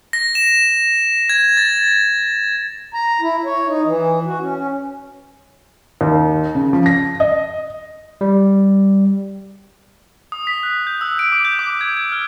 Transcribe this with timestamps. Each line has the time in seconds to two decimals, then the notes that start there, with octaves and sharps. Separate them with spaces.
0.13 A#6
0.35 E7
1.29 G#6
1.57 A6
2.94 A#5
3.21 E4
3.45 C#5
3.67 D#4
3.86 E3
4.26 F#4
4.41 C#4
4.57 C#4
6.01 D#2
6.55 C#3
6.73 F3
6.86 A#6
7.20 D#5
8.21 G3
10.32 D#6
10.47 B6
10.63 F#6
10.87 G6
11.01 E6
11.19 D7
11.32 D6
11.45 G6
11.59 D6
11.81 G#6
11.97 G#6
12.12 F6